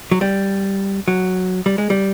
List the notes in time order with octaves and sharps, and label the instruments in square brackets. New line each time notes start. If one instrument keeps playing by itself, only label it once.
[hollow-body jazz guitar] F#3
G3
F#3
G3
G#3
G3